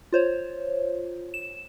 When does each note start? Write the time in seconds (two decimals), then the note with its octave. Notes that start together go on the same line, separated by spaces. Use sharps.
0.13 F4 C5 C#5
1.34 E7